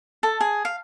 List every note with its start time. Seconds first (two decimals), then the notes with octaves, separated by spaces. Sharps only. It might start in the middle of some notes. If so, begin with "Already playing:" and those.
0.23 A4
0.41 G#4
0.65 F5